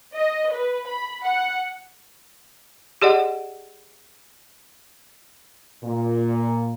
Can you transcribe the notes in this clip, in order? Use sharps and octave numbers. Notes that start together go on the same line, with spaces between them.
D#5
B4
B5
F#5
G4 G#4 D5 D#5 F#5
A#2